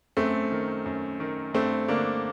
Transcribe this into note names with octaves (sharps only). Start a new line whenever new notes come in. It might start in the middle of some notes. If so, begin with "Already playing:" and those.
F#2 A3 C4
D#3
F#2
D#3
G2 A3 C4
D3 A#3 D4